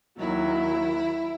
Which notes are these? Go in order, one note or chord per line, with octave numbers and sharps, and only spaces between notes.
D#2 D#3 F#3 E4